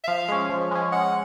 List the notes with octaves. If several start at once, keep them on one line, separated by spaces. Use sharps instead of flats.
E5
F3 F5
G#3 C#4
F3
G#3 C#4
G#3 F#5